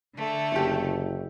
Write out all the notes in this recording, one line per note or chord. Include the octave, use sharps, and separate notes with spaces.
D3 A3
F#1 E4 G4